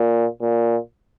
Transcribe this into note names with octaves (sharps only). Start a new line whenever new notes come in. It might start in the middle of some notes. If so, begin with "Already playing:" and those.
Already playing: A#2
A#2